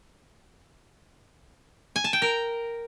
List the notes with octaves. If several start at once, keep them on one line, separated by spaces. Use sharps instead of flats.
G#5
A5
G5
A#4